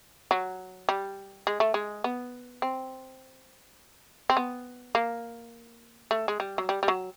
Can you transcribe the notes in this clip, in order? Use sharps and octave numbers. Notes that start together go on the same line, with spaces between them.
F#3
G3
G#3
A3
G#3
B3
C4
C4
B3
A#3
A3
G#3
G3
F#3
G3
G3
F#3